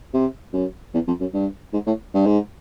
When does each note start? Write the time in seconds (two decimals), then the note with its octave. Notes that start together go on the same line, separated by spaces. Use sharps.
0.13 C3
0.53 F#2
0.94 E2
1.07 F2
1.20 F#2
1.34 G2
1.73 G#2
1.87 A2
2.14 G2
2.26 G#2